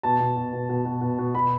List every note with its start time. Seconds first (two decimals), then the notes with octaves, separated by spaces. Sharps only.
0.03 B2 A5
0.19 B2
0.36 B2
0.52 B2
0.69 B2
0.85 B2
1.01 B2
1.18 B2
1.34 B2 B5